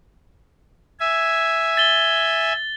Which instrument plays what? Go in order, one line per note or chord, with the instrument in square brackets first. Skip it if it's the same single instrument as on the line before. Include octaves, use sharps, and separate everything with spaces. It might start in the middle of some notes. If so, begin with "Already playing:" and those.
[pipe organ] E5 G#5
[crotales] A6 G7